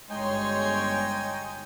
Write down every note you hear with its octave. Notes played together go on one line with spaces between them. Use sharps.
G1 G#3 D#4 C#5 G5 G#5 C6